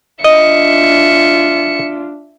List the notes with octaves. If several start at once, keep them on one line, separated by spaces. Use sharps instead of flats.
D4 F4 D#5 E5 C#7